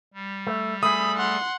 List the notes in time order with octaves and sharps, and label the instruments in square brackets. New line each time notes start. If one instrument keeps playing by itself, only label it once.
[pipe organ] G3
[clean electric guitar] A3
[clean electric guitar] A3 G#4 [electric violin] B5 [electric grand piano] D#6
[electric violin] F#5 C6